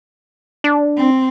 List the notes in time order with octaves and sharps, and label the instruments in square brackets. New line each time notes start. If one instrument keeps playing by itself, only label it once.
[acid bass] D4
[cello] C4